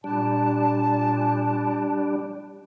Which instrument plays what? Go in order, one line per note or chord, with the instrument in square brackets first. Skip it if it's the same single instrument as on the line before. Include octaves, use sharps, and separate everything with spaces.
[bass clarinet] A#2 [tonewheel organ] G3 D4 [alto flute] A5